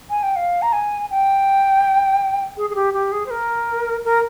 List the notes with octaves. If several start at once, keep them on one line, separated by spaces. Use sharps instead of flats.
G#5
G5
F5
A#5
G#5
G5
G#4
G#4
G4
G4
G#4
C5
A#4
A#4